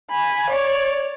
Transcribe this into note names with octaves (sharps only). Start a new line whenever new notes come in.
G#5 B5
C#5 D5